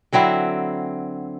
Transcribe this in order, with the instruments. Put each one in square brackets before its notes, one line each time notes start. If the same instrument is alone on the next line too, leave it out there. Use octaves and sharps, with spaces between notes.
[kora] D3 F#3 C4 E4